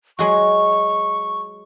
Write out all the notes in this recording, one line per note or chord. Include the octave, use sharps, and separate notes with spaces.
F#3 G#3 F#4 C#6